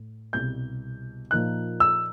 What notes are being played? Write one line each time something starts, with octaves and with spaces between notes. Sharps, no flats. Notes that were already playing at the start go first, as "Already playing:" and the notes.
Already playing: A2
C2 B2 G3 G6
A#2 F3 A#3 D#4 F#6
E6